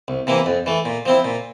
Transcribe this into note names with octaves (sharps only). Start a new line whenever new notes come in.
C2
C3 E3 A#3 E4
F2
E3 A3
A#2
F3 C4 E4
A#2